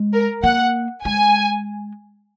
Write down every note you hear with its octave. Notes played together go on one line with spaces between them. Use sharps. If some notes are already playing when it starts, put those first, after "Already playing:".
Already playing: G#3
A#4
A#3 F#5
G#3 G#5